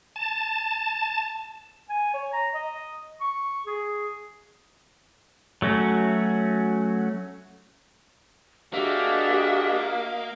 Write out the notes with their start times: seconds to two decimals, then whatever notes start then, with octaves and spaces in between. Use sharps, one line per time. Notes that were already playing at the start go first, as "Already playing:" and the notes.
0.16 A5
1.89 G#5
2.14 C#5
2.33 A#5
2.55 D#5
3.21 C#6
3.66 G#4
5.62 F#3 A3 C#4 F#4
8.74 G#3 A#3 D4 F#4 G4 D#5 E5